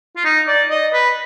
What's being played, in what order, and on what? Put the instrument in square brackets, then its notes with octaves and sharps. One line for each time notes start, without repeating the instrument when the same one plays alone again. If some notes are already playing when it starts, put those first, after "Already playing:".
[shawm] F4
D#4
D5
D#5
B4